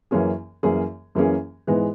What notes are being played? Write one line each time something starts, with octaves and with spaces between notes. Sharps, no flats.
F#2 E3 A#3 C#4 G#4
F#2 E3 A#3 C#4 G#4
F#2 E3 A#3 C#4 G#4
G#2 E3 G#3 B3